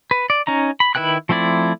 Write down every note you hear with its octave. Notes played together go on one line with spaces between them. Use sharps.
B4
D5
C#4 D#4 A#5
B5
D#3 E4 B4 G5 F#6
F3 A3 C4 E4 D5